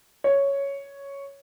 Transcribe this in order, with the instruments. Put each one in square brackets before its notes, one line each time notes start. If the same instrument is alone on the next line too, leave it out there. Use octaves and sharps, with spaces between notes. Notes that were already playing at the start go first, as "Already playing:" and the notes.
[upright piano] C#5